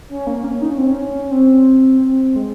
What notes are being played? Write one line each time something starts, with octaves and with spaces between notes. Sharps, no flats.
C#4
A#3
C#4
D#4
C#4
C4
C#4
C4
C4
G#3